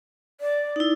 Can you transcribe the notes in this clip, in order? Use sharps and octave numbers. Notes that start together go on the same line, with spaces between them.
D5
D#4 E4